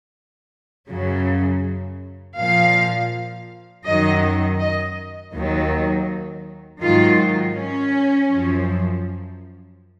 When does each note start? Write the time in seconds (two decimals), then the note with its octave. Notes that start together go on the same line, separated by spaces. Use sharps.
0.90 F#2 C#3 F#3
2.39 A#2 F3 F5
3.86 F#2 D#3 F#3 D#5
4.60 D#5
5.33 D#2 D#3 F#3
6.81 G#2 D#3 F#3 F4
7.56 C#4
8.30 F#2 F3